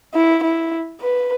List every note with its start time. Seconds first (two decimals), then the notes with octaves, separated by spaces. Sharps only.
0.15 E4
0.44 E4
1.02 B4